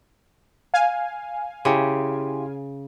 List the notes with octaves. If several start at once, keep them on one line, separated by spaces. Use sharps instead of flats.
F5 G#5
C#3 E4 G4 C6